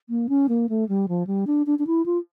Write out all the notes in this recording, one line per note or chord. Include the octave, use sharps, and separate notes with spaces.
A#3
C#4
A#3
A3
G3
F3
G3
D4
D4
D4
E4
F4